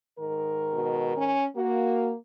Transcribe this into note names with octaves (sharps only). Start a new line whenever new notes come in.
G#2 D#3 A#4
B2
C#4
A#3 F#4